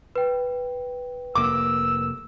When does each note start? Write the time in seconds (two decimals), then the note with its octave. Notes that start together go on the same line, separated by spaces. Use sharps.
0.16 B4 G5
1.35 F1 A#3 D6 E6